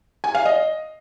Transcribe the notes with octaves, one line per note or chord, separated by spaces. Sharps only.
G#5
F5
D#5